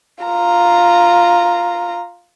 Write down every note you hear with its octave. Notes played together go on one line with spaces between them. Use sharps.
F4 A#5